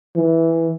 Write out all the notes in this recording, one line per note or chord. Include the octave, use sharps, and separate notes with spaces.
E3